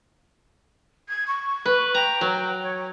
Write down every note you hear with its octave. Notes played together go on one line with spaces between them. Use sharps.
G#6
C#6
B4
G5 A#5
F#3
C#5